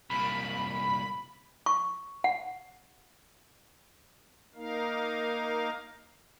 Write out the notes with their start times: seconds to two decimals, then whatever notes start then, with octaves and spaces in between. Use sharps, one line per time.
0.10 C2 A#2 B5
1.66 C#6
2.24 F#5
4.55 A#3 D#4 A#4 F5